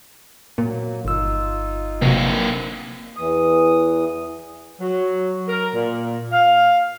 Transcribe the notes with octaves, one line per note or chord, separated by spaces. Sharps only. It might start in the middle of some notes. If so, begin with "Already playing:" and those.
A#2 F#3 A#3
G1 D#4 F4 E6
C3 F#3 A#3 C4
E2 E3 D#6
F#3
A#4
A#2
F5